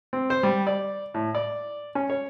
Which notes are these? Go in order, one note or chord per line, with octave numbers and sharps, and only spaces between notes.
C4
C5
G3
D5
A2
D5
C#4
C#5